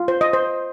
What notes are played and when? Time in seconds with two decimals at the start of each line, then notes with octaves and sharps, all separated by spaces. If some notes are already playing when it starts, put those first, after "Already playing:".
Already playing: F4
0.08 C5
0.21 D#5
0.33 C5